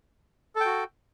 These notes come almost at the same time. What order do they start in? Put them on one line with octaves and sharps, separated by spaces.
A4 G5 F#4